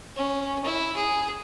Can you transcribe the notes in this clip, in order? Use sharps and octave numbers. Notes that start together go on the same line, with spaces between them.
C#4
E4
G#4